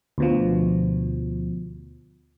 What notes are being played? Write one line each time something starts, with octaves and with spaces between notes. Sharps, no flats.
D2 B2 F3